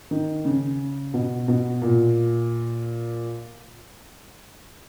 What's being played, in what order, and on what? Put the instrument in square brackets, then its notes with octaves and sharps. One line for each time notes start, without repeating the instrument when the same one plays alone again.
[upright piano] D#3
C#3
B2
B2
A#2